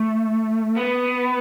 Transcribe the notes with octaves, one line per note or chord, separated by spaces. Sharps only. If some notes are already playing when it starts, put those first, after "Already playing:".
Already playing: A3
B3